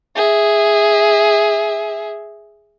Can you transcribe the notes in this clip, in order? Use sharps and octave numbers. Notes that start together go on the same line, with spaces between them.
G#4 E5